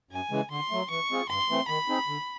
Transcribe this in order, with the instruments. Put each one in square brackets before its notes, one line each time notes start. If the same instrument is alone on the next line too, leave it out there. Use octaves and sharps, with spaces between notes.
[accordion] F#2 [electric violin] G#5
[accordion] C#3 E3 G#3
[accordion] D3 [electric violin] C6
[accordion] F#3 A3
[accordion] E3 [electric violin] C#6
[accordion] G#3 C4 F4 G#4
[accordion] G2 [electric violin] C6
[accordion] E3 A3 C4
[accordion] D#3 [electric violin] B5
[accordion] G#3 C4 D#4 G#4
D3